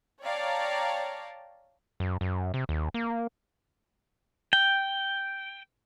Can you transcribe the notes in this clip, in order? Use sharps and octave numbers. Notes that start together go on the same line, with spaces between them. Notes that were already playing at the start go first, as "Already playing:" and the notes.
C#5 D5 F5 G5 A5 A#5
F#2
F#2
C3
D#2
A#3
G5